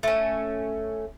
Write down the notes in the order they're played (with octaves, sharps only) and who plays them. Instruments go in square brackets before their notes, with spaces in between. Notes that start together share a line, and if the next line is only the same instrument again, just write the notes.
[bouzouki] A3 C#4